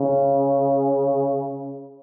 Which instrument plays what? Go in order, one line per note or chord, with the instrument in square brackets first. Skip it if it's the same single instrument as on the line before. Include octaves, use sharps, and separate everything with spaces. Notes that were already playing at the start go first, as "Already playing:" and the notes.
Already playing: [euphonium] C#3